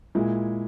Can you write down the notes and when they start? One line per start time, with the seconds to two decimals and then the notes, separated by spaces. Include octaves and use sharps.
0.15 A#2 G#3 E4